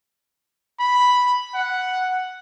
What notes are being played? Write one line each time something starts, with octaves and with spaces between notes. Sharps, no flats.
B5
F#5